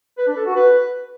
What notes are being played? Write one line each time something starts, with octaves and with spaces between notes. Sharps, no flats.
B4
D4
A4
F#4
B4